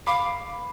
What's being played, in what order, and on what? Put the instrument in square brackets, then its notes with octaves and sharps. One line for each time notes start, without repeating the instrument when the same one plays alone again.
[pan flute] F5 [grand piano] B5 D6